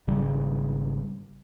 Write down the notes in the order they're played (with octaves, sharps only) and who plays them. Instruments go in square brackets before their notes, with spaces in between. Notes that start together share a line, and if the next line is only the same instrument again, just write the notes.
[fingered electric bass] G#1 C#3 G3